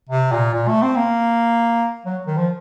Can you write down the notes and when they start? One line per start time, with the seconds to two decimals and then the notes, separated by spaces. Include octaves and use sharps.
0.09 C3
0.31 A#2
0.53 A#2
0.68 A3
0.82 C4
0.96 A#3
2.05 F#3
2.27 D#3
2.37 F3